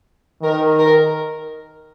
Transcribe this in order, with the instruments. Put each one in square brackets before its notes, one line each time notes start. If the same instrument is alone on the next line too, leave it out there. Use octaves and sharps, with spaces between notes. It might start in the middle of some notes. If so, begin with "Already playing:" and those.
[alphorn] D#3 [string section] A#4
[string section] A#4